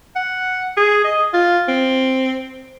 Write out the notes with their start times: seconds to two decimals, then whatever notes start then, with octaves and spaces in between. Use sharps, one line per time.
0.16 F#5
0.77 G#4
1.04 D#5
1.34 F4
1.68 C4